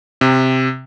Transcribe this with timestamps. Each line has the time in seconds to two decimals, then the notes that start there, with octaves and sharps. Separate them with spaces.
0.21 C3